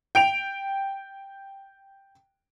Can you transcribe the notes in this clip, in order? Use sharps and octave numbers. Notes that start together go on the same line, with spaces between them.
G5 D7 F7